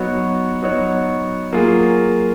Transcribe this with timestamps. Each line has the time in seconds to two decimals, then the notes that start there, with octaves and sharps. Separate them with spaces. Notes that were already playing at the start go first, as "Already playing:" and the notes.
Already playing: F#3 B3 D#4 F#4 C#5
0.62 F#3 B3 D#4 F#4 C#5
1.53 F#3 A#3 F4 G#4